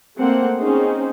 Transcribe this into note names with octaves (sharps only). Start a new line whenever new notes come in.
A3 A#3 C4 F#5
C4 C#4 D#4 G#4 C5